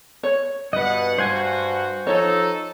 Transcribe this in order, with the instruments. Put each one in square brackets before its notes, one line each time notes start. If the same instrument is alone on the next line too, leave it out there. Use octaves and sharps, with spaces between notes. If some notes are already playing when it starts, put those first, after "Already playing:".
[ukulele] C#5
[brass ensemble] G2 B2 F#5 [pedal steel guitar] B4 D#5
[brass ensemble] G2 F#4 [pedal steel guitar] C5 F#5 G#5
[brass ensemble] F3 D#4 A4 [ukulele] C#5